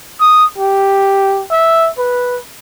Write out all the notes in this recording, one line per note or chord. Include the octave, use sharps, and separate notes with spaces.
D#6
G4
E5
B4